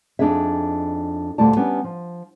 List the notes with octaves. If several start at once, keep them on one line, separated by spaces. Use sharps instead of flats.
F2 C#3 D4 D#4 G#4 E5
D2 A#2 G3 A3 D5 A5
G3 B3 C#4 D4
F3